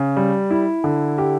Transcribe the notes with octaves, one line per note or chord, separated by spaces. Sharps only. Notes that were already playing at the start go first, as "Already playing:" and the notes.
Already playing: C#3
G3
E4
D3
G4